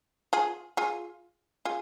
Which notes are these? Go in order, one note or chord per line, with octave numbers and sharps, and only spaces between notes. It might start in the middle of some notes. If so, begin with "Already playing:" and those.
F4 G#4
F4 G#4
F4 G#4